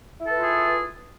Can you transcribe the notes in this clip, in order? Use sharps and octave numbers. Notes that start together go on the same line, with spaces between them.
E4 F4 G#4 A4 B4